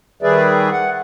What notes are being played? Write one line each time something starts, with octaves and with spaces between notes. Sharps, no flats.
D#3 G3 G#4 B4 D5 E5
F#5